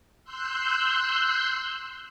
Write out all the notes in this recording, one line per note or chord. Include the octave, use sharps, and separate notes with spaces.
C6 E6 F#6 G6